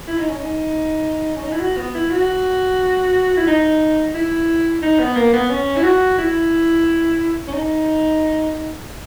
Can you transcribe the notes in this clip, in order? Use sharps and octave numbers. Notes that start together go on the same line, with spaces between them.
E4
D#4
C#4
D#4
C#4
D#4
E4
F#4
B3
E4
F#4
E4
D#4
E4
D#4
B3
A#3
B3
C#4
E4
F#4
E4
C#4
D#4